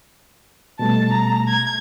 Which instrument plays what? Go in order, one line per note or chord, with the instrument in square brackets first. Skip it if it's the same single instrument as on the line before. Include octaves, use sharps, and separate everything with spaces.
[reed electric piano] B2 G3 A3 [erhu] A5
[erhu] A#5
G#6